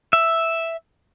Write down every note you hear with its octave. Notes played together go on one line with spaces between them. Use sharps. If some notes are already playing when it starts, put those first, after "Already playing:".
E5